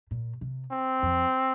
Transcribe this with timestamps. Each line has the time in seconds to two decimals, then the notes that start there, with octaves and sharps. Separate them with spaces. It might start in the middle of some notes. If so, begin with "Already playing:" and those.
0.11 A#2
0.41 C3
0.72 C4
1.03 F2